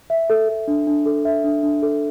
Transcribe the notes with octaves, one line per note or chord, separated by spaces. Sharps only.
E5
A4
A4
D4
D4
A4
E5
D4
D4
A4